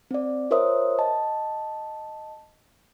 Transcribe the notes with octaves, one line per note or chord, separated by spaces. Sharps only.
C4 D5
F4 A#4 C5 C#5 E5 D#6
D#5 A5